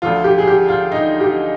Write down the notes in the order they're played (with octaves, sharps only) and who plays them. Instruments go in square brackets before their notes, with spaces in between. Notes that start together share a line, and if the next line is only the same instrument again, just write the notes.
[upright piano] D2 D3 F3 F4
G4
G#4
G4
F4
D#4
G4